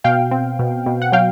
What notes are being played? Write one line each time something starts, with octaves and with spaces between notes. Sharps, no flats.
B2 F5 G5
C4
B2
B2
F#5
F#3 F5 G5